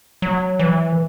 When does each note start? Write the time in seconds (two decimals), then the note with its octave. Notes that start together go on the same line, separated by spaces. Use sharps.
0.22 F#3
0.59 E3